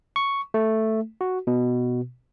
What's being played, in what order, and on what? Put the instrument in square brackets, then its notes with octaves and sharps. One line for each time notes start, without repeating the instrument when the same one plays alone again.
[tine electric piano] C#6
A3
F#4
B2